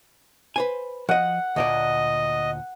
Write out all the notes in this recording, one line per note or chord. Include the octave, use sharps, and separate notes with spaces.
B4 C5 G#5
F3 D#5 F#5
D2 A#2 D5 D#5